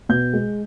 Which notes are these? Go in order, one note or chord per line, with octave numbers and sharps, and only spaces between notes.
B2 G6
G#3